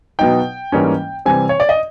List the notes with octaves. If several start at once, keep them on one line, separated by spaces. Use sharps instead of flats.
B2 F#3 B3 D#4 G5
G#2 E3 G3 A#3 C#4
C3 E3 G3 C4 G#5
C#5
D5
D#5